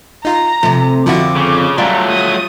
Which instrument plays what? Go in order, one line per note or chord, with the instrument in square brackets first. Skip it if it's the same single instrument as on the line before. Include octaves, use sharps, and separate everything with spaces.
[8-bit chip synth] D#4 F4 [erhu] A#5
[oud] C3 A3 [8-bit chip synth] F3
[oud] F2 D3 [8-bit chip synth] F3 E4 F#4 [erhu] D6
[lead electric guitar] C#3
[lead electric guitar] F#3 A3 [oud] G3 F4 D5 [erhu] A#5
[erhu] D#6